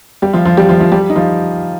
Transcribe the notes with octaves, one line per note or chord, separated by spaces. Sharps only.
G3 G4
F3 F4
F3 F4
G3 G4
F3 F4
F3 F4
G3 G4
D#4
F3 F4